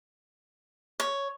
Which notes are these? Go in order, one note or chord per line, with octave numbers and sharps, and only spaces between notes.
C#5